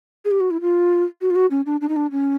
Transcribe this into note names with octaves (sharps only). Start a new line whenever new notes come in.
G#4
G4
F#4
E4
F4
F#4
F4
F#4
C#4
D4
D4
D#4
D4
C#4